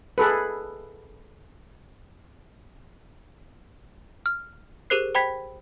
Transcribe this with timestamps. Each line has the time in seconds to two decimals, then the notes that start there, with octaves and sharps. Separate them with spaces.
0.18 G#4 A4 B4
4.26 F6
4.90 G4 G#4 A#4 C5 F#6 C7
5.14 C5 G5 B5 G#6 B6